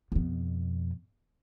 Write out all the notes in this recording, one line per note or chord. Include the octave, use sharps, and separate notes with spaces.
F2 B2